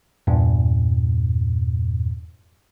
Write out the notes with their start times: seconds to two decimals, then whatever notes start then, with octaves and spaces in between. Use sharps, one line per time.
0.27 E2 G2 A#2